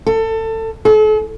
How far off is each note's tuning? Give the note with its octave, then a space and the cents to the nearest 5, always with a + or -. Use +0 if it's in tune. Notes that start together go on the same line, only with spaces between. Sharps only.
A4 +25
A4 -40